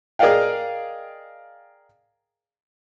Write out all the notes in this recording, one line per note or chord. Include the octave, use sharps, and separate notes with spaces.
G#4 A#4 D5 D#5 F5 G5